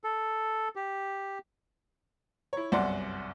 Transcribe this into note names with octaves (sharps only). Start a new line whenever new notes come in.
A4
G4
E4 C#5
G1 C2 F#2 D5 F#5 C6